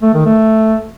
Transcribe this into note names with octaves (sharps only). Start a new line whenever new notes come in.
A3
D#3
A3